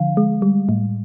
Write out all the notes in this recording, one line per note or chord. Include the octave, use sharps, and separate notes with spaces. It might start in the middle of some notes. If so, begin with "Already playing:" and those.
Already playing: D3 F3 F5
G#3
G3
A2